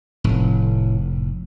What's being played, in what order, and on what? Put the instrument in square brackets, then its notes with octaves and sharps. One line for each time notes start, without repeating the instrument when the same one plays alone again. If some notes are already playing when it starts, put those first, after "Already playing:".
[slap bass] F1 [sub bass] A2